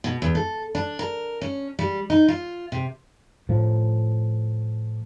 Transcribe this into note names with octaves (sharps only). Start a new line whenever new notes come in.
B2
E2
A4
D4
A#4
C#4
G3
D#4
F4
C3
A2 F3